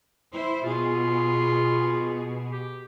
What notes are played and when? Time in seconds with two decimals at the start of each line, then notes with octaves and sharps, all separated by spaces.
0.32 E4 C5
0.64 B2 F4 G#4
2.52 G4